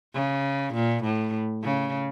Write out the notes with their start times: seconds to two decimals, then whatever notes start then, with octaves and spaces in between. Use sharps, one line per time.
0.15 C#3
0.74 A#2
1.04 A2
1.63 C#3